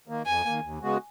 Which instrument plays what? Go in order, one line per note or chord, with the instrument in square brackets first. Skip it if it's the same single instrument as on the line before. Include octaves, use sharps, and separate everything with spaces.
[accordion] D#3 A#3
[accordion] F2 [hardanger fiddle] G#5
[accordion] D#3 A#3
D#2
C#3 G#3 B3 F#4